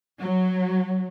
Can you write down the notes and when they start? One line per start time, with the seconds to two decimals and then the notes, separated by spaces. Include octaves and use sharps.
0.20 F#3